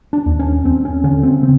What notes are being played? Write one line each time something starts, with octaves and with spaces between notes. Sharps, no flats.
D4
D#2
C#4
D#2 C4
C#4
D3 C#4
C4
C#3 C4